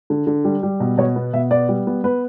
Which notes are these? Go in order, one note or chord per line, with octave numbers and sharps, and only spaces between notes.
D3
D3
G3
G3
B2
B2 C#5
B3
B2 E5
B3 D5
G3
B3
B3 B4